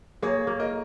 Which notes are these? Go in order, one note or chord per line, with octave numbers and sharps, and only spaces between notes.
A#3 G#4 C#5
A#3
A#4 D#5